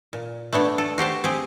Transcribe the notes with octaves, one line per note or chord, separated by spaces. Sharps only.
A#2
A3 B3 D4 C#5
A4
F#4 G4 C5 A5
C4 G4 G#4